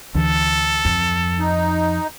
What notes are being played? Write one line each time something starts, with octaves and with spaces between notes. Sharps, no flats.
D2 E3 A4
F2
D#4